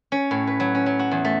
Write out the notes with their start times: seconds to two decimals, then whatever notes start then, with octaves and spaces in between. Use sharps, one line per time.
0.12 C#4
0.31 A2
0.47 B4
0.60 F#3
0.75 C#4
0.86 F#3
0.99 F#4
1.11 E2
1.25 A3